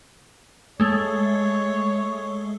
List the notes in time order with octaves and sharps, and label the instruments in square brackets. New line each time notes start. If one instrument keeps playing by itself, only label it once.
[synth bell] G#3 A3 [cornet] C#5